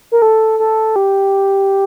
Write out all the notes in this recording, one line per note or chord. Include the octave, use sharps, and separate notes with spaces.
A#4
A4
A4
G4